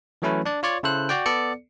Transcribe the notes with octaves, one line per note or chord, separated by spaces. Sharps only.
E3 F#3 A3 C#4 E4 B4
D4 D5
F4 C#5 D5 C#6
C#3 E4 A4 C5 F#6
F#4 D5 G5
B3 A4 D5 C#7